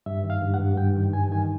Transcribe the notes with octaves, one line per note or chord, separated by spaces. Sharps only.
G2 E5
D#3
F5
G2
F#5
G2
G2 G5
D#3
G2 G#5
D#3 G#5